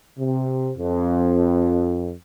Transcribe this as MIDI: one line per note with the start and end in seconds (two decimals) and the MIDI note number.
0.19 0.71 48
0.78 2.14 41